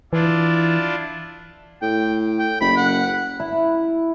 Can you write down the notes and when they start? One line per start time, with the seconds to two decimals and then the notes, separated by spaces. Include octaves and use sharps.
0.13 E3 D4 E4 F4
1.82 A2 G5
2.39 G5
2.61 F#1 B5
2.77 F#5
3.40 E4